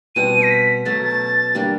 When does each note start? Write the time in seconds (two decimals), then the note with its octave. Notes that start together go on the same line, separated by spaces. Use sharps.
0.16 B2 G3 C4 D#7
0.43 A#6
0.50 B6
0.85 B2 F#3 A3 C#4 A6
1.03 A6
1.55 G3 A#3 D4 G4